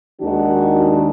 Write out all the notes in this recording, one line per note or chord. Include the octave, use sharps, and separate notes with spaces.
D#2 D#3 G#3 D4 D#4 F#4